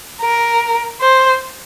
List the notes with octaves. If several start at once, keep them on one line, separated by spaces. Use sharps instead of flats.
A#4
C5